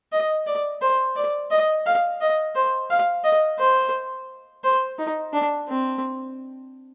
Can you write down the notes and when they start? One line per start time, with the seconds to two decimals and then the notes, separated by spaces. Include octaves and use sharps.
0.12 D#5
0.47 D5
0.81 C5
1.16 D5
1.51 D#5
1.86 F5
2.21 D#5
2.55 C5
2.90 F5
3.24 D#5
3.59 C5
4.64 C5
4.98 D#4
5.33 D4
5.68 C4